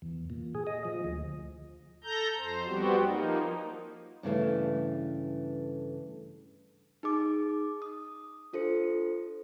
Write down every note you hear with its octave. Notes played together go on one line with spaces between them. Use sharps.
E2
A#2
G#4
D#5
F3
D2
A4 A#5 G6
F2 C5
G3 B3 C4 F#4 G4
F3 A#3 D#4
G2 C#3 E3 A3
D#4 G#4 D6
D#6
D4 F4 A4 C5 C#7